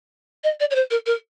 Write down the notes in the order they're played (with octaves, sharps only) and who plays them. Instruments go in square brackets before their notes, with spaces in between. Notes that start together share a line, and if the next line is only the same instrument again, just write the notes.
[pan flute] D#5
D5
C#5
C5
A#4
A#4